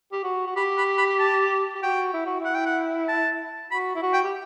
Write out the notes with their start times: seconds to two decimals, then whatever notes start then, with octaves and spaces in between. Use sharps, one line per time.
0.12 G4
0.24 F#4
0.47 F#4
0.56 G4 B5
0.78 B5
0.98 B5
1.19 A5
1.75 G4
1.82 F#4 G5
2.13 E4
2.26 F#4
2.39 E4 F#5
2.55 G5
2.66 F#5
3.08 A5
3.70 F#4 B5
3.95 E4
4.02 F#4
4.13 G5
4.24 G4